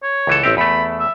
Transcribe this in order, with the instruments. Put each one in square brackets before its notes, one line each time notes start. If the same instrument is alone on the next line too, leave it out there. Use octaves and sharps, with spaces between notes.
[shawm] C#5
[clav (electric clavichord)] C#2 E3 A4
[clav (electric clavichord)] A1 C4 G4 [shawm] E5
[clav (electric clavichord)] E2 A3 [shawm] B5
[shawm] E5